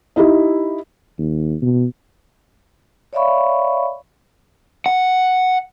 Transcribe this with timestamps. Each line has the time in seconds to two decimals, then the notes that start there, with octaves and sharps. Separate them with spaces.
0.16 D#4 E4 G4
1.19 D#2
1.62 B2
3.13 C#5 D5 E5 F5 B5 C#6
4.86 F#5